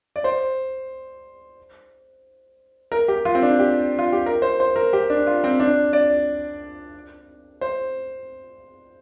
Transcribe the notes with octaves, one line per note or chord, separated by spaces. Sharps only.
D5
C5
A#4
G4
F4
C4
D4
G4
F4
G4
A#4
C5
C5
A#4
G4
D4
F4
C4
D4
D5
C5